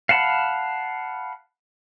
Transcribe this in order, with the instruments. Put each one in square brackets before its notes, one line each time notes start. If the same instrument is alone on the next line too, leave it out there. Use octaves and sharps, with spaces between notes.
[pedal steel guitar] F5 F#5 A5 B5